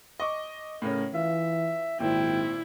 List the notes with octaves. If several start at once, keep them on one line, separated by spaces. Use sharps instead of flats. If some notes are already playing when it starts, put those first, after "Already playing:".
D#5 C#6 D6
A2 C#3 C#4 A#4
E3 F4 E5
G#1 A#2 D#3 C4 E4 G5